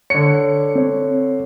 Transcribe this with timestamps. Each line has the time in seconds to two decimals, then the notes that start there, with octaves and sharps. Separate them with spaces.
0.10 D3 C#5 C#7
0.75 C4 C#5